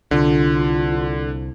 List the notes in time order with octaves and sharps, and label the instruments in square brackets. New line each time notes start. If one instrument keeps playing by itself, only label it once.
[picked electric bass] C2 [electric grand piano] D3 [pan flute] F4